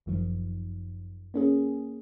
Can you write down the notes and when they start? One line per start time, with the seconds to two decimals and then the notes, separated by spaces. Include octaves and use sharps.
0.06 G1 F#2 D#3 F3
1.34 A#3 C#4 G#4